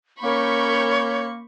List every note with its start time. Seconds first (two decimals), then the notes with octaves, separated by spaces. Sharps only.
0.23 A#3 C#4 A#4 C#5 B5 C#6 G6